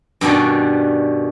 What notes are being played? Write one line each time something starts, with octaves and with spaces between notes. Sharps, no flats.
G2 B2 D#3 C#4 D4